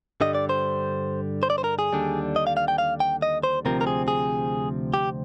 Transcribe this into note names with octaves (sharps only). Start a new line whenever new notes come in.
G2 D3 G3 D#5
D5
C5
C5
D5
C5
A#4
G#4
D#2 D3 G3 D4
D#5
F5
F5
G5
F5
G5
D#5
C5
D2 C3 F3 C4 A#4
A#4
G#4
G#4
G4